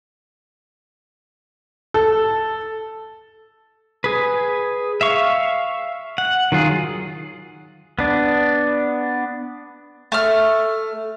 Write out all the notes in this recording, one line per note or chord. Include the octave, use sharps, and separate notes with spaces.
A4
G#4 B4
E5 F5 C#6
F#5
D#3 F#3 F4 G#4
B3 D4
A3 F6